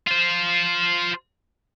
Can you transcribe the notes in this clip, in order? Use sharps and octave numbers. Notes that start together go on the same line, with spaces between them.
F4 C5